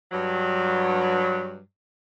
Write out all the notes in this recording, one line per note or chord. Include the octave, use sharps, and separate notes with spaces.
G2 F#3